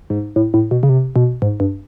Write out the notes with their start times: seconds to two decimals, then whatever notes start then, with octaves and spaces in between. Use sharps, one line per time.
0.10 G#2
0.36 A2
0.54 A2
0.71 B2
0.83 C#3
0.89 C3
1.16 B2
1.42 G#2
1.60 G2